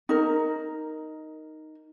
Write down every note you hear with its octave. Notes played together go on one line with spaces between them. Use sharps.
D#4 A#4